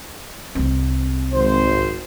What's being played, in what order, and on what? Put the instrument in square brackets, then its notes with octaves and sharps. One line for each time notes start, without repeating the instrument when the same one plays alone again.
[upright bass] C2 C4
[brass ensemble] G#1 C5